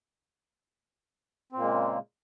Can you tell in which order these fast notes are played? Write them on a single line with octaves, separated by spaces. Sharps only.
C4 A#2 A#3 G#3 C#3